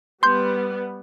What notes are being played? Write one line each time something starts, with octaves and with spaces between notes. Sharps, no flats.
G3 B3 C6 G6